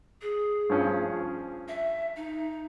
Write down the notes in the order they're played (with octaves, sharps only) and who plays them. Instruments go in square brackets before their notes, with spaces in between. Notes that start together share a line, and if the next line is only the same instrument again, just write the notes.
[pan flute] G#4
[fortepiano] G2 F3 C#4
[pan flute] E5
D#4